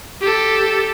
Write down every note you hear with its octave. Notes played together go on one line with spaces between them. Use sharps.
G4 A4